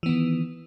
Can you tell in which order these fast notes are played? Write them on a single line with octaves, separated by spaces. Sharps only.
E3 B3 D#3